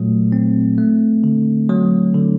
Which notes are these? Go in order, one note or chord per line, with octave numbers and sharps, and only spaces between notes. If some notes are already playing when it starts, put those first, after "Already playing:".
Already playing: A#2 F#3 A3
C4
A3
D3
F#3
D3